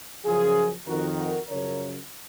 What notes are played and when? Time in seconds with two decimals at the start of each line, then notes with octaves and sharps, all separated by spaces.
0.25 F#2 C#3 F3 F4 G#4
0.86 F2 D#3 F#4 A#4
1.17 F#4 A#4
1.48 F#2 C#3 F3 A#4 C#5